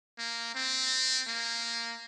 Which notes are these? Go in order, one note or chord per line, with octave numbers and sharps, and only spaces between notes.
A#3
C4
A#3